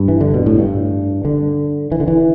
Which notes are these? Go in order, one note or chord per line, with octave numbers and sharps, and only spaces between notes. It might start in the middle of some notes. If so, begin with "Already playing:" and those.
Already playing: G2
E3
D3
B2
A2
G2
D3
E3
D3
E3